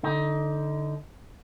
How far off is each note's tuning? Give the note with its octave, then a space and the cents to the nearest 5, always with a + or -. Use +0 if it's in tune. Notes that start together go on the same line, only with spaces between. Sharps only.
D3 +0 D#4 +20